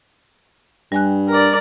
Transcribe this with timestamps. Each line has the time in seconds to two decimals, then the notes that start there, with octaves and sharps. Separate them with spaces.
0.92 G2 G3 G#5 F#6
1.29 A#4 D5